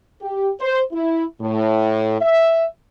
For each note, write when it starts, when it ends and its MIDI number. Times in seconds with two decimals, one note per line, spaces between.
0.21 0.48 67
0.60 0.80 72
0.93 1.24 64
1.41 2.16 45
2.21 2.64 76